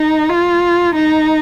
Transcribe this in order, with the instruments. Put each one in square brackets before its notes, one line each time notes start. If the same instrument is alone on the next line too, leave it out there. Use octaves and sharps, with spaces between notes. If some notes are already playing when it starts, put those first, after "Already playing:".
Already playing: [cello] D#4
F4
D#4